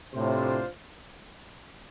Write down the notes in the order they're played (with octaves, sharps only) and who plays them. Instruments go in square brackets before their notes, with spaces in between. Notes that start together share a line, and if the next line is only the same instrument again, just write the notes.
[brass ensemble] A2 C3 [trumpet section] D4 F4 C5